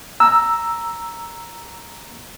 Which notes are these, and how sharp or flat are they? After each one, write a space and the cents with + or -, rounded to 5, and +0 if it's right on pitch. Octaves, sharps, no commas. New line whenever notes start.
A#5 +0 E6 +0